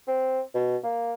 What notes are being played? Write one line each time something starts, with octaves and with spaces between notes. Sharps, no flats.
C4
B2
A#3